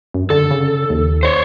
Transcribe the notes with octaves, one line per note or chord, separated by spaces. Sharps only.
F#2
D3 A4
C#3
D#2
C5 C#5